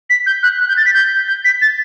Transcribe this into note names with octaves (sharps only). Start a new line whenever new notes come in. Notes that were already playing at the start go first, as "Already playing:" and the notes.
B6
G6
F#6
F#6
G6
A6
B6
G6
G6
B6
A6